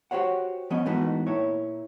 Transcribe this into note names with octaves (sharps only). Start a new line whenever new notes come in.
F#4 G4 C5 C#5 F#5
F3 B3 C#4 D#5
G#2 E3 A3 B3 D#4 F#4
A#2 E4 C#5